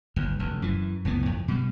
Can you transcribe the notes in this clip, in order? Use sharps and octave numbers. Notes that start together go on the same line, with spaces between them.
G1 D#2
F1 D2
F#2 E3
F1 C#2 E3 B3
F2
B2 G3